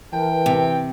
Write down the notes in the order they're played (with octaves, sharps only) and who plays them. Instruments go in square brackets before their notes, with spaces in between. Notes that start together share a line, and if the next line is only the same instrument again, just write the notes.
[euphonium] E3 [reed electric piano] A#4 B4 A5 [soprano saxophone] G5
[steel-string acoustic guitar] C3